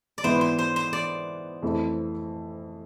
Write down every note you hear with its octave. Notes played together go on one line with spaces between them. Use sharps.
D5
G#2 E3 B3 E4 C5
C5
C5
C5
D5
F2 E3 A3 E4